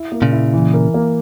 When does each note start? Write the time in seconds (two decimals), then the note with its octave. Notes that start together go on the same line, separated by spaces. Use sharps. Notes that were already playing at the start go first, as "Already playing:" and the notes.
Already playing: E4
0.12 A#3
0.22 A#2 C#3
0.32 E4
0.53 E3
0.74 A#4
0.94 A#3